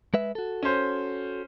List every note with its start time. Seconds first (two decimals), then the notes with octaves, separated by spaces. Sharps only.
0.14 G#3 B4 E5
0.35 F#4 A4
0.63 C#4 C5